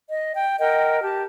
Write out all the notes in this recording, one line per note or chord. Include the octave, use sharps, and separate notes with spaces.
D#5
G5
A#4 D#5 F#5 G5
G4 A5